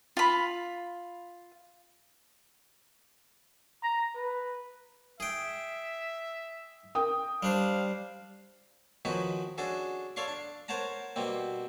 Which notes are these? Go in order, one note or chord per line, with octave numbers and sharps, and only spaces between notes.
F4 B5
A#5
B4
G#4 E5 G5
A#4 G5 D#6
G3 D4 C5 F5
D#3 F3 C#4 D#4 F#4 B4
C#4 D4 F#4 G#4 A4
A4 C#5 D5 F5 C6 C#6
D4
A#4 C5 C#5 F#5 A5 A#5
B2 G3 A#3 C4